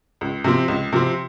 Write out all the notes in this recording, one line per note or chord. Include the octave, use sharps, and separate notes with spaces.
C#2
C3 F3 C4
C#2
C3 F3 C4